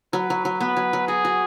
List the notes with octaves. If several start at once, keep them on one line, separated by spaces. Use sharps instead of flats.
F#3 B4
F#3
F#3
B3 B4
F#3
F#3
F#4 G#4
F#4